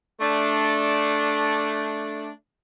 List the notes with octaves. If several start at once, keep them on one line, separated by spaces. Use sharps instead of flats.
A3 D4